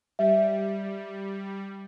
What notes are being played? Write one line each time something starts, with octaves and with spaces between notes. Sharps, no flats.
G3 E5